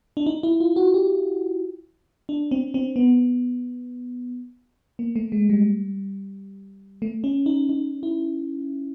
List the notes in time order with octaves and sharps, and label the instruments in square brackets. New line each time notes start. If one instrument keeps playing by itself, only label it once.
[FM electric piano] D4
D#4
E4
F4
F#4
G4
D4
C4
C4
B3
A#3
A3
G#3
G3
A3
C#4
D#4
D#4
E4